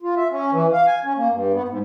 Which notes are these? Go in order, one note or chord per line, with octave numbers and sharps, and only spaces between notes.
F4
E5
C#4
E3
F5
G#5
C#4
A#3
G2
B3
G#2